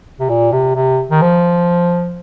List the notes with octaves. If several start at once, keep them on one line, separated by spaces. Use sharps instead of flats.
C3
A#2
C3
C3
D#3
F3